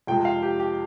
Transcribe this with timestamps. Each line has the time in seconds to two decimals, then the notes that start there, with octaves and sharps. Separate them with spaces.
0.07 F2 C3 F3 G#3 G5
0.25 F5
0.42 G4
0.60 G4